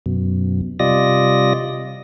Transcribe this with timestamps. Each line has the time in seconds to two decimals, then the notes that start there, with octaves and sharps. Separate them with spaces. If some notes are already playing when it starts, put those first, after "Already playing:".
0.06 F#2 B2
0.79 C3 G3 F4 D5 D#5 A#6